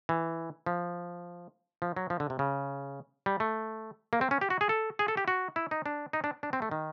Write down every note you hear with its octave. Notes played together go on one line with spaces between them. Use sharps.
E3
F3
F3
F#3
F3
D3
C3
C#3
G3
A3
A#3
C4
C#4
G4
F#4
G#4
A4
G#4
A4
G4
F#4
E4
D#4
D4
D#4
D4
D4
C4
A3
D#3